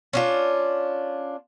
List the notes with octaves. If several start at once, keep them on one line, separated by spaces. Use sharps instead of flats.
C#4 D4 F4